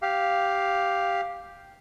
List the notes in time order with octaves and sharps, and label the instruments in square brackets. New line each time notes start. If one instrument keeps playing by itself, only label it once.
[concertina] G4 F5